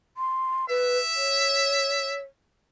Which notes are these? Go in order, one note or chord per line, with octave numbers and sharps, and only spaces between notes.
C6
B4 E5
C#5